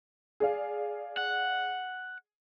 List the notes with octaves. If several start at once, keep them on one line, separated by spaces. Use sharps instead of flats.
G#4 D5 F5
F#5